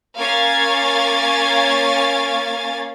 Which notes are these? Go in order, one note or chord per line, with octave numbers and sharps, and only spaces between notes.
A#3 C#4 F5 G#5 G#6 A6